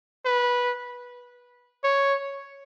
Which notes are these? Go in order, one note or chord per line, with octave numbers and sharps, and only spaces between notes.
B4
C#5